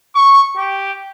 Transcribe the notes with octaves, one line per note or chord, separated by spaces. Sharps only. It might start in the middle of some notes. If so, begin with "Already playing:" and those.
C#6
G4